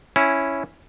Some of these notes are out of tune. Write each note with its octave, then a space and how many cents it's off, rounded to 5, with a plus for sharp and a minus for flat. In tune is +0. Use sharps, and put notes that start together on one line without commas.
C#4 +0 E4 +0